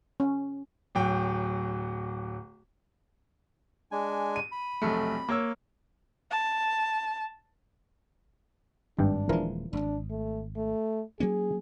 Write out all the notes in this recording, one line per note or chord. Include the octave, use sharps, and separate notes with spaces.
C#4
D1 F#3 G5
G#3 D4 G#5
D#7
B5
F1 B1 A3
A#3 C#5 E6
A5
G#1 G2 D4 G5
D#1 E3 F3 G#3 A#4
D#1 G#1 D4
A3
A3
F#3 A#3 C#4 G#4